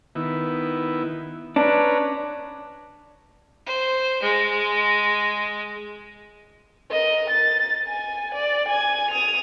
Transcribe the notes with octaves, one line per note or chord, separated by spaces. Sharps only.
D#3 B3 E4
C#4 D4 B4 A#5
C5
G#3
A#4 D#5
A6
G#5
D5
G#5 G#6
D#6 F7